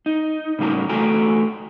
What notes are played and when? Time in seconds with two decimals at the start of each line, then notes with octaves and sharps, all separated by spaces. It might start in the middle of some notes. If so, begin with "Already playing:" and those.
0.06 D#4
0.59 A2 C#3 G3 A#3 C#4 A#5
0.89 E2 A3 F#4 G5 G#5 A#5